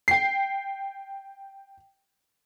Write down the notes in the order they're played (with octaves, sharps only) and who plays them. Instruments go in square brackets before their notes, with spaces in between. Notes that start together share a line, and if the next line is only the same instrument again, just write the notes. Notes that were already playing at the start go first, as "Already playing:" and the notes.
[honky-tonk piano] G5 C7